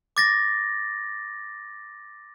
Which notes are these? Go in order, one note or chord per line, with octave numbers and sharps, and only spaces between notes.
D6 A6 A#6